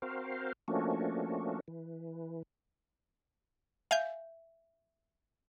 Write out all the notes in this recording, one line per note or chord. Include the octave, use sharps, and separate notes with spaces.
C4 F#4 A#4 C5 F5
F3 A3 A#3 C#4 D4 F#4
E3
E5 F5 G#5 G6